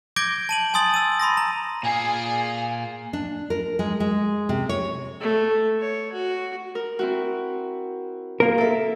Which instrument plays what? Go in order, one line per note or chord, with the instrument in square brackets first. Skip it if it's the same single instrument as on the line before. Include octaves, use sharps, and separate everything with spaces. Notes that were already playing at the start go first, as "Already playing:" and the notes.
[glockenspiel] D6 G6 G#6 A#6 D7 G7
A5 D#7 F#7
G#5 C6 D#6 A6 F#7
E6 D#7
B5 C6 D#6 A#6
A#5
[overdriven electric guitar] A#2 F4 [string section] G#4
[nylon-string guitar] D4
A#4
G#3
G#3
C3
C#5
[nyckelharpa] A3
C#5
F#4
[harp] A#4
C4 E4 F#4
[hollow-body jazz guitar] A#3 A#4
[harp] A4 E5